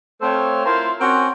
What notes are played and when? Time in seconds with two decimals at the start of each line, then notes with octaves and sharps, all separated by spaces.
0.22 A3 C4 A4 C5 C#5 F5
0.66 E4 F4 A#4 C5
1.00 C4 C#4 F#4 A#4 F#5 G#5